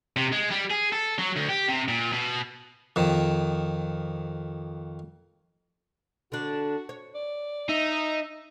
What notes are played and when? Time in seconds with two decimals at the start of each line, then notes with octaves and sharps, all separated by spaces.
0.17 C3
0.32 G#3
0.51 G3
0.70 G#4
0.92 A4
1.18 F#3
1.36 D2
1.49 G4
1.68 C3
1.88 A#2
2.13 B2
2.96 F2 D#3
6.32 D3 D4 F#4
6.89 C#5
7.14 D5
7.69 D#4 E5